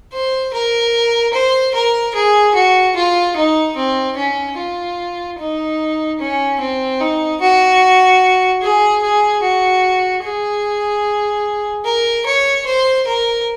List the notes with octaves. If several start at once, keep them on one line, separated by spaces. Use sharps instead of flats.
C5
A#4
C5
A#4
G#4
F#4
F4
D#4
C4
C#4
F4
D#4
C#4
C4
D#4
F#4
G#4
G#4
F#4
G#4
A#4
C#5
C5
A#4